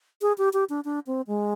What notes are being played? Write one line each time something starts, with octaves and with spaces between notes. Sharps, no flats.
G#4
G4
G4
D4
D4
C4
G#3